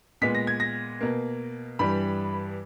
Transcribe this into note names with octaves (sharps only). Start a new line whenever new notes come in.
A#2 G#3 B3 B6
A#6
G#6
A#6
B2 A#3
G2 E3 G3 B5